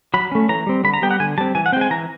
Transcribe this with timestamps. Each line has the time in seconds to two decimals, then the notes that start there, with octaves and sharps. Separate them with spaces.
0.14 F#3 B5
0.32 A3 C#4
0.49 E3 A#5
0.67 G3 C4
0.84 D3 B5
0.94 A#5
1.02 G3 B3 G5
1.11 F#5
1.20 D3 G#5
1.38 G3 C4 A5
1.55 E3 G#5
1.66 F#5
1.72 C4 G5
1.76 G#3 G#5
1.90 E3 A#5